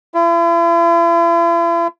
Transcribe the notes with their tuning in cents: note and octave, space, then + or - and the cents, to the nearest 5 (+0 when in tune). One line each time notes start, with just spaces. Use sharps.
E4 +45